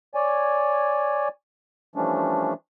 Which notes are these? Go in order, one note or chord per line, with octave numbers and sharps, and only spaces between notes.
C#5 D5 G#5
E3 F3 G3 A3 C#4 D4